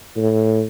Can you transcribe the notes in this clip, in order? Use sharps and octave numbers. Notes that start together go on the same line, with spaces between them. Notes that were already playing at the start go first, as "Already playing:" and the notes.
A2